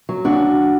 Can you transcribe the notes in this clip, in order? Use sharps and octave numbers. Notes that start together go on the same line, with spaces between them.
F#3
C#3 D4 F#4